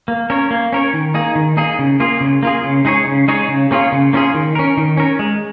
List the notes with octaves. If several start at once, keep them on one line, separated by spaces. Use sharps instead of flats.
A#3
C#4 A#4 C#5
A#3
C#4 A#4 C#5
D#3
A#3 D#4 G#4
D#3
A#3 D#4 G#4
C#3
A#3 F4 G#4
C#3
A#3 F4 G#4
C#3
G#3 D#4 G#4 C#5
C#3
G#3 D#4 G#4 C#5
C#3
A#3 C#4 F4 G#4
C#3
A#3 C#4 F4 G#4
D#3
C#4 A#4
D#3
C#4 A#4
G#3